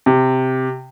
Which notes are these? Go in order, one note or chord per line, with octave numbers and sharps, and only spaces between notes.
C3